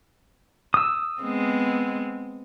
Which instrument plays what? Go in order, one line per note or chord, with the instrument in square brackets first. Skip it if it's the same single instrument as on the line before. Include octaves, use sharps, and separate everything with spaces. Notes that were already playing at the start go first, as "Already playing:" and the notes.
[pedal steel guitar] D#6 E6
[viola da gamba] G#3 B3 C4